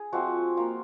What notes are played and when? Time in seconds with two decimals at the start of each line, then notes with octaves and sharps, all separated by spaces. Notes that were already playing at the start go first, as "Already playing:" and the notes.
Already playing: G#4
0.12 F3 G#3 C4 F4 F#4
0.57 A#3 F4